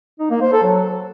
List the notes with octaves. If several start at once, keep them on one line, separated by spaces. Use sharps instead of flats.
D#4
A#3
C5
A4
F#3